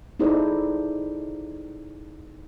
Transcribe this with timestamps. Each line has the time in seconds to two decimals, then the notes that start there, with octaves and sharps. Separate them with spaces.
0.20 D#4 E4 G#4 A4 C5 D5